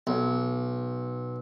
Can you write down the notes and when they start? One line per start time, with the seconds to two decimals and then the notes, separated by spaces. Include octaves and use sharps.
0.07 B1